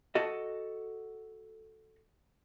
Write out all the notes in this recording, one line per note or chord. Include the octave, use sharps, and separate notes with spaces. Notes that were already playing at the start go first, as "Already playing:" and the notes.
F#4 A4 D#5